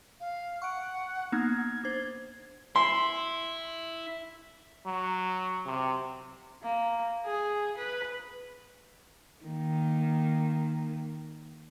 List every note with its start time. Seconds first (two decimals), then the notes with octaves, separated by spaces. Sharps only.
0.20 F5
0.62 F#5 C#6 D7
1.32 A#3 B3 D#4 G#6
1.84 D4 C5
2.76 E4 C6
4.86 F#3
5.66 C3
6.63 A#3
7.25 G#4
7.77 B4
9.45 D#3 A#3